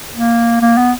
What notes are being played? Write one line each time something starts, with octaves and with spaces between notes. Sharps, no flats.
A#3
A#3
B3